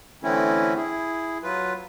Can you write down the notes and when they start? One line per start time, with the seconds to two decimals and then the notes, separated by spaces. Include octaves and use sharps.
0.23 D3 E3 A3 C4 C#4 E4
0.76 E4 G#4
1.43 F#3 F4 B4